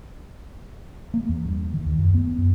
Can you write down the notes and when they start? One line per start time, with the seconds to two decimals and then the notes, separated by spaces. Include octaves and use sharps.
1.14 A#3
1.28 E2
1.45 G2
1.74 D#3
1.85 D#2
1.98 F#2
2.15 B3
2.38 F#2